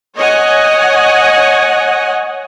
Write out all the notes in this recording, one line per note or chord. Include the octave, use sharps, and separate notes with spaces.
C#5 D#5 F#5 G#5